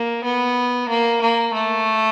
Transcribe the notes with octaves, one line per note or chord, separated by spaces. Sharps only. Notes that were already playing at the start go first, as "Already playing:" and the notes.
Already playing: A#3
B3
A#3
A#3
A3